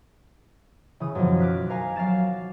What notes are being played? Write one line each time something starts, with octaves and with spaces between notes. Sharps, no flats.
C#3 E3 D#6
F#2 B2 D#3 F3
D6 F6 F#6 B6
A#4 F5 G#5 A#5
F#3 F5 D6 A6 E7